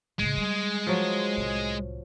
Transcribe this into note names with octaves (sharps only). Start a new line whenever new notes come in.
A2 C#3 G#3
G3
F3 F#3
C2 A2